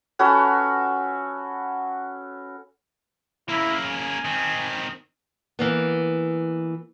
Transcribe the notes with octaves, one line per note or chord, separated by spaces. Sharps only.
C#4 F#4 A4 B4
C#3 A#3 E4
G#5
D#3 C4
E3 A#3 B3